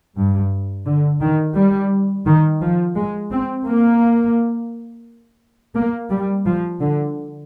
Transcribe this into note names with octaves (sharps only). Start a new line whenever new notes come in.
G2
D3
D#3
G3
D#3
F3
G#3
C4
A#3
A#3
G3
F3
D3